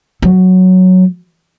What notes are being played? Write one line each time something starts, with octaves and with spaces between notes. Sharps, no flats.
F#3